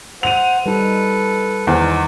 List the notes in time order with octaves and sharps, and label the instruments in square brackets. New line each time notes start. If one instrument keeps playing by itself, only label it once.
[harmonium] C5 F#5 [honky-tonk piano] D#7 F7
[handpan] G3 D#4 [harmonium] A4 B4
[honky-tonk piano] E2 [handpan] D#3 D#4 C5 [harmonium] G#5